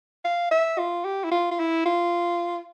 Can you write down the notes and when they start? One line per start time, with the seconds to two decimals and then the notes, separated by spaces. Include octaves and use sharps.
0.24 F5
0.51 E5
0.78 F4
1.04 G4
1.24 E4
1.31 F4
1.51 F4
1.59 E4
1.85 F4